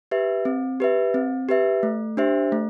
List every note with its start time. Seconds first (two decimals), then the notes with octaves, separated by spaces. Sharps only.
0.11 G4 B4 E5
0.45 C4
0.80 G4 B4 E5
1.14 C4
1.49 G4 B4 E5
1.83 A3
2.17 D4 G4 C5 E5
2.52 A3